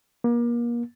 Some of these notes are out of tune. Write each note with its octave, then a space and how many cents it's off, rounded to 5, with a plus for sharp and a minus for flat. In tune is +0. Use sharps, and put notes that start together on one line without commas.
A#3 +35